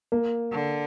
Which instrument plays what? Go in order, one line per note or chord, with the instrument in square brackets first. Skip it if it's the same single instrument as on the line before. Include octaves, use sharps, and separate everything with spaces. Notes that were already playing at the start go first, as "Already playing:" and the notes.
[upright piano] A#3
[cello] D3